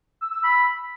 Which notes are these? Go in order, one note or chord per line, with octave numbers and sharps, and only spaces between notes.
E6
E6
B5